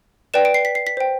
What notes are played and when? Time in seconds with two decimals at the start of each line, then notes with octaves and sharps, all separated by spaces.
0.34 B4 D5 G5 E7
0.45 D7
0.54 C7
0.65 B6
0.75 C7
0.87 B6
0.97 C5 G5